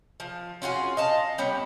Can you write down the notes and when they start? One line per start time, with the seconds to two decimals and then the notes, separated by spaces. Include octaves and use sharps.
0.20 F3
0.62 C#4 F4 F#4 G#4
0.97 D#5 F5 A5
1.38 G3 B3 C#4